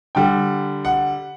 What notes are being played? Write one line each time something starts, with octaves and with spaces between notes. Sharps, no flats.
D3 G3 G5
F#5